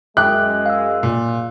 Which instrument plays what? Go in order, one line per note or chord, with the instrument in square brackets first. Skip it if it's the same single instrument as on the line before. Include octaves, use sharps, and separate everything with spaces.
[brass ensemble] F#2 G#3 [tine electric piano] E5 D6 D#6 [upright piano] G5 [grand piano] F#6
[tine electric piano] F5 E6
[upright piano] A#2